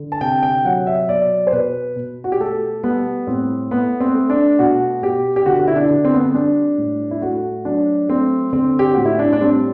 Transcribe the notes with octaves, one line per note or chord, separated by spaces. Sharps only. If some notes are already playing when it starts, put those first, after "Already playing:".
Already playing: D3
A5
C3 G5
G5
F#3 F#5
E5
B2 D5
C5
B2 B4
B2
F#4
G4
A3 A4
G3 B3
A2 C4
A3 B3
C4
A3
D4
B2 F#4
B2 G4
G4
D3 F#4
F#4
E4
D4
D3
C4
B3
C4
G3 D4
A2
E4
A3 F#4
F#3 D4
A3 C4
D3 C4
G4
A2 F#4
E4
D4
D4
G3 C4